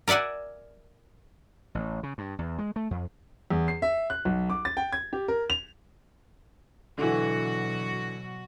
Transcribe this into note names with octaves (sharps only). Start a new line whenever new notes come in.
A#4 D5 E5 F#5 G#5
A1
C#3
G2
E2
G#3
A3
F2
E2
C7
E5
F#6
B1
D6
A6
G5
G#6
G4
A#4
F7
B2 D3 E3 F#3 F#4